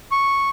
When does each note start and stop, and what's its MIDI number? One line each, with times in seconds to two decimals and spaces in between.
0.12 0.49 85